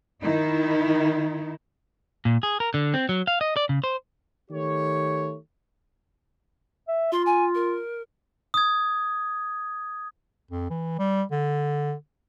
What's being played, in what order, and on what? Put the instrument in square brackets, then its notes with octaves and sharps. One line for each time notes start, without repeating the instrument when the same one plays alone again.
[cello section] D#3 D#4 E4
[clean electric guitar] A#2
G#4
A#4
D3
C4
F#3
F5
D#5
D5
C#3
C5
[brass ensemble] D#3 A3 G4 C#5
[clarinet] E5
[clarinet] F4 [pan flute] C6
[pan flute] G#5
A#4
[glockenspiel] D#6 G#6
[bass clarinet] F2
E3
G3
D3